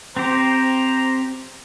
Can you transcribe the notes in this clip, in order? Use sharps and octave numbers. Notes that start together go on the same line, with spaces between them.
C4 G4 C5 A#5